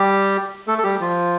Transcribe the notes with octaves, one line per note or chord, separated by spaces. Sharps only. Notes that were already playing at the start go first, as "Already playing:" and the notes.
Already playing: G3 G4
A3 A4
A4
G3 G4
F3 F4